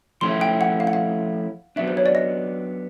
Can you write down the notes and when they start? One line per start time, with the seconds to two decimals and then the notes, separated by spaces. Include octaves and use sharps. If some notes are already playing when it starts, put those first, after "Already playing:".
0.21 F3 A3 C#4 E4 C6
0.41 G5
0.61 F#5
0.80 F5
0.87 F#5
0.93 F5
1.76 F#3 B3 D4 E5
1.88 C5
1.97 C#5
2.06 D5
2.15 D#5